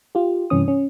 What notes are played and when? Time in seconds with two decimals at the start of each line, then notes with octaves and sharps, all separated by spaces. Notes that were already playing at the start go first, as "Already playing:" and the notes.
0.15 F4 G4
0.50 G2 C3 E3 C#4 D#6
0.68 C#4